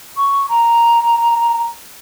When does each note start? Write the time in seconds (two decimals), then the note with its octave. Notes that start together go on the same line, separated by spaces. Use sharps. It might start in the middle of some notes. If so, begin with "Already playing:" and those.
0.17 C#6
0.49 A#5